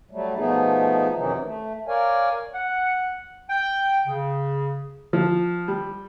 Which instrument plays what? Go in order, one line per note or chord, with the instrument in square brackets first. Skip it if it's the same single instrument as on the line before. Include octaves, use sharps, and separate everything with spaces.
[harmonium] F#3 G3 A3
B2 F3 A3 B3 D#4 G#4
F#2 C3 D#3 E3 F#3 D#4
A3
A#4 C#5 D5 F5 G#5
[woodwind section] F#5
G5
C#3
[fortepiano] F3
G3